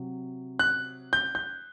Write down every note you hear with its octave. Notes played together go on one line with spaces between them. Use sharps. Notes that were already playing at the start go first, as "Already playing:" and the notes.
Already playing: C3 F#3
F#6
G6
G6